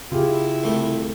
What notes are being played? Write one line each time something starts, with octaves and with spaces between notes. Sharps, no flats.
C#3 E4 F4 G4 G#4
C2 A3 G5